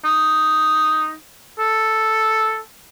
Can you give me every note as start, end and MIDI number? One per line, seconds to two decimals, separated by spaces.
0.05 1.14 63
1.59 2.59 69